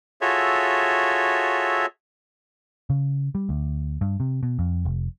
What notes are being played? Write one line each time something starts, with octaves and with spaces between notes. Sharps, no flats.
F4 F#4 G#4 A4 C#5 E5
C#3
G3
D2
G2
C3
B2
F2
F1